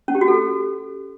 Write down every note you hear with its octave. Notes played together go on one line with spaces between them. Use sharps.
C#4
G4
F#4
A4